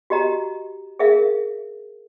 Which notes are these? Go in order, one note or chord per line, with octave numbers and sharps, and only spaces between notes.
F#4 G4 D#5 A#5
G#4 A#4 E5 F5